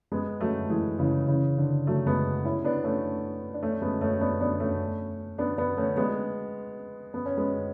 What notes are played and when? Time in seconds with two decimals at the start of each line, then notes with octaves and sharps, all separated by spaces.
0.12 G#3 B3
0.41 F#3 A3
0.69 E3 G#3
0.98 C#3 E3
1.28 C#3 E3
1.58 D3
1.87 F#3 A3
2.06 G#3 B3
2.45 C#4 E4
2.64 B3 D4
2.84 A3 C#4
3.54 D4
3.62 A3 C#4
3.82 G#3 B3
4.01 A3 C#4
4.21 B3 D4
4.41 B3 D4
4.60 A3 C#4
5.38 B3 D4
5.58 B3 D4
5.77 A3 C#4
5.97 G#3 B3
7.14 B3
7.26 C#4
7.37 G#3 B3